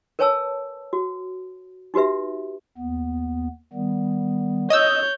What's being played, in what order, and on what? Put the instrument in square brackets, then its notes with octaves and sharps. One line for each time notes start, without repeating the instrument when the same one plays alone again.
[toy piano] A#4 B4 C#5 G#5 A5 E6
F#4
D#4 F#4 G4 B4 E5
[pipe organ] D#2 B3
D#3 G3 B3
[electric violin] C#5 G6 [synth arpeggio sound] D#5 D#6 E6